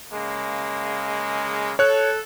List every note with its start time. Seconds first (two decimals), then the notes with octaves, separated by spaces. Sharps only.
0.13 C#3 G#3 A#3
1.79 A4 C#5 F#6